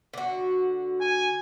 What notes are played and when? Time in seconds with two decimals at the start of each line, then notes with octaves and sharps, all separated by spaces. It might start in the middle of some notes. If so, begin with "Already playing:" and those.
0.14 D3 F#4
1.01 G#5